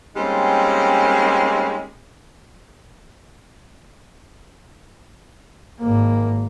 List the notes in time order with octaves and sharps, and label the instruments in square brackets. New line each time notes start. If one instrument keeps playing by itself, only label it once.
[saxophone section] G3 G#3 A#3 C4 C#4 D#4
[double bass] G#1 A#3